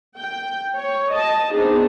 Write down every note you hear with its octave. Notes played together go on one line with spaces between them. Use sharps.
G5
C#5
D#5 A5
B3 C4 D4 D#4 G#4